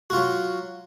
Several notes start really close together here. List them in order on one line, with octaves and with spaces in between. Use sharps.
F#4 F4 F#3